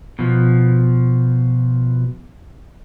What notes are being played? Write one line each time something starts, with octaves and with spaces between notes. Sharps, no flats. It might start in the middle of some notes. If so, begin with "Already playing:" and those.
B2 F3